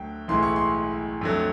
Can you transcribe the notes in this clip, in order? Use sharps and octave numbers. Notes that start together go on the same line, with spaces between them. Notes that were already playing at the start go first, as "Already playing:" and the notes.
Already playing: D2 D3 F#3 A3 G5
B1 A2 E3 G#3 C6
C#6
C6
F2 D3 F#3 A3